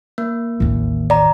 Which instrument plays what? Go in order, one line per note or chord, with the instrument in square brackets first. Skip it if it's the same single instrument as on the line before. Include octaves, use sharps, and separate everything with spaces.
[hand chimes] A#3
[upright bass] A1 D#2
[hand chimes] D5 A#5